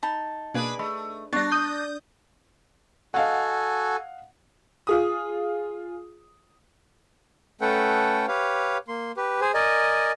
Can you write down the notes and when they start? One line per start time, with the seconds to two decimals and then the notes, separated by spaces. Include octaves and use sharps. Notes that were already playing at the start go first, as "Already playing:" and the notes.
0.03 D#4 A5 B5
0.54 B2 A#3 D4 G#4 B4 D7
0.79 A3 D#5 B5
1.33 G3 B3 D4 C#6 A6 A#6
1.52 D#6 G6
3.14 F#4 A4 D#5 F5 F#5 G#5
4.87 F4 G#4 D#6
7.61 A3 C#4 A4 B4 F#5 G5
8.28 G4 B4 C#5 F5
8.88 A#3 C6
9.17 G4 B4
9.41 G#4 C5 G#5
9.54 A#4 D5 D#5 G#5